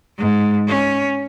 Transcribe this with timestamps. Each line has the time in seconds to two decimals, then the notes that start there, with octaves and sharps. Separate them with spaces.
0.18 G#2
0.67 C#4